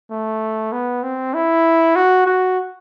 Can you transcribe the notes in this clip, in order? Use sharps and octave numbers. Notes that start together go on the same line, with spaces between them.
A3
B3
C4
E4
F#4
F#4